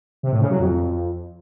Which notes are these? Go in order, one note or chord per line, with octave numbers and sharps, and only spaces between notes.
C3
A2
C#3
F#3
F2